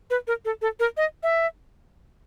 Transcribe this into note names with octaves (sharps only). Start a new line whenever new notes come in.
B4
A#4
A4
A4
A#4
D#5
E5